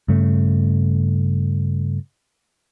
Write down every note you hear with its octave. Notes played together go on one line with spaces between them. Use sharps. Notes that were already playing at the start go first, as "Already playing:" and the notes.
G2 C#3 A3